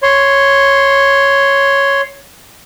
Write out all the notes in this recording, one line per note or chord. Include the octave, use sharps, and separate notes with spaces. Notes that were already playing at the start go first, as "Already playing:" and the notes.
C#5 C6